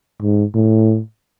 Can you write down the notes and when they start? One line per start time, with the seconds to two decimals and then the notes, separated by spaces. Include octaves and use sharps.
0.22 G#2
0.54 A2